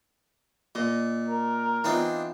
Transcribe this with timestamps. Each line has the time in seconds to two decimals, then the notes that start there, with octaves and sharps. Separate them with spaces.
0.75 A#2 D#5
1.28 A#4
1.84 E3 B3 C4 D4 D#4 F4